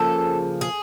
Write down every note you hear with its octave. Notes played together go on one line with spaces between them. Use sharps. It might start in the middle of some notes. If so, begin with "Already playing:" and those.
Already playing: C#3 F3 A#3 A4
G#4